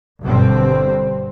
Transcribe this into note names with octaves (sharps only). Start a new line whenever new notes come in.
G1 G2 B2 D3 G3 C4